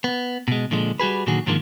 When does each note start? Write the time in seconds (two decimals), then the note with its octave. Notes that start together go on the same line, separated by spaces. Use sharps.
0.04 B3
0.48 B2 G#3
0.71 A#2 D3 F3 G#3
1.00 G3 F#4 G#4 B4
1.27 A#2 D3 D#3 F#3 F#4 G#4
1.46 G#2 D3 D#3 F3 G#3 A#3